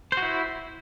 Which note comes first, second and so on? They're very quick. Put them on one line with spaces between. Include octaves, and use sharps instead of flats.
C5 F#4 E4